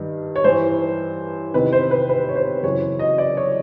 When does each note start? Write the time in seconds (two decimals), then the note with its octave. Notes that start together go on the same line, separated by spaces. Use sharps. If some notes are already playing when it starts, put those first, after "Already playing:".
Already playing: G2 D#3
0.36 C#5
0.44 G2 E3 C5
1.54 E2 C3 D#3 B4
1.72 C5
1.91 B4
2.09 B4
2.29 C#5
2.35 C5
2.63 F#2 C#3 E3 C#5
2.99 D#5
3.18 D5
3.37 C#5